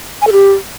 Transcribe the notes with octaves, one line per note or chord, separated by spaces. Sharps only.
G#5
A4
G4